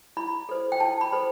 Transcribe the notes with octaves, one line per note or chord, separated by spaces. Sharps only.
E4 B5
A4 C5
G5
E4 A5
B5
A4 C5